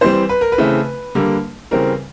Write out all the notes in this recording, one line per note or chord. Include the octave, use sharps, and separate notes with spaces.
E3 G3 C4 C5
B4
A#4
B4
C#3 E3 A3 C4
D3 G3 A#3
C#3 E3 G3 C4 A#4